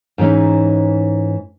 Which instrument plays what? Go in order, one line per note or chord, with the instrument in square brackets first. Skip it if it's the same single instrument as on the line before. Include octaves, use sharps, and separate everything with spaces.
[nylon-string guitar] G#2 E3 C#4 D#4